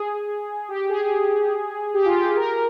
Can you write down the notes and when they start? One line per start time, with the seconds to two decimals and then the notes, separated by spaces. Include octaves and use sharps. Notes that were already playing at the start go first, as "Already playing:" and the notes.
Already playing: G#4
0.69 G4
0.89 G#4
1.94 G4
2.05 F4
2.15 G4
2.37 A#4